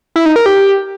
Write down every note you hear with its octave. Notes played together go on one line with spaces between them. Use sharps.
E4
D#4
A#4
G4